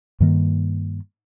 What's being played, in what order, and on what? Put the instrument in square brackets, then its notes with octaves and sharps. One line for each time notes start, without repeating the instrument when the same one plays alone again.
[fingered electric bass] G2 D#3 A#3